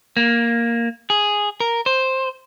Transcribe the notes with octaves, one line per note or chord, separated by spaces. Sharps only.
A#3
G#4
A#4
C5